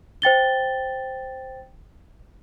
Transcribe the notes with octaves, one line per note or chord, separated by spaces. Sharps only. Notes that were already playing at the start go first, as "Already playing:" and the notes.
C5 G5 A6 G7